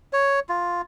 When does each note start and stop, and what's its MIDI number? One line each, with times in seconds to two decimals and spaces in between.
0.13 0.40 73
0.49 0.82 65